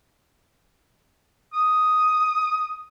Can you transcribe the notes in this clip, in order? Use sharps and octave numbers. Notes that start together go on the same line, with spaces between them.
D#6